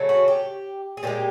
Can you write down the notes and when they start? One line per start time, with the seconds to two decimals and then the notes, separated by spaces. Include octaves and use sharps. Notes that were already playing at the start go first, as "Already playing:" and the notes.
Already playing: C#3 F#3 A3
0.09 F#4
0.28 G4
0.97 G#4
1.03 A#2 F3 G#3 G4